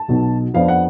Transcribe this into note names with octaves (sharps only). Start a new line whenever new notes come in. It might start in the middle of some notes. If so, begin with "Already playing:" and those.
Already playing: A5
B1 B2 F#3
F2 F3 B3 D4 F5
F#5